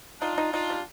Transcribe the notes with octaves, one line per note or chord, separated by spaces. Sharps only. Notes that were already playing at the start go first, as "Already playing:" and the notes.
D4 D#4 F4
D#4
D4 D#4 F4
G3